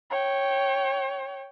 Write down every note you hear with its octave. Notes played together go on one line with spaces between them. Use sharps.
C#5 G5